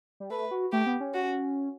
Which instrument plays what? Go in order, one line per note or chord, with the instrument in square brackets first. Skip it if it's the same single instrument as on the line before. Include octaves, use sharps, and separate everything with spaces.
[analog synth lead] G3
[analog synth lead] A3 [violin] B4
[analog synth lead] F#4
[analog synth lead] A3 [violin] G4
[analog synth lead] B3
C#4
[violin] F#4